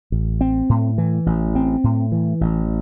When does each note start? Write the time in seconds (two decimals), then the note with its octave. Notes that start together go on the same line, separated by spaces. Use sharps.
0.12 A1
0.41 C4
0.69 A2
0.98 E3
1.26 A1
1.55 C4
1.84 A2
2.12 E3
2.41 A1